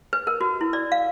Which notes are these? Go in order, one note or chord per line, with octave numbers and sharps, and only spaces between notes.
B4
A#4
F#4
E4
D5
F5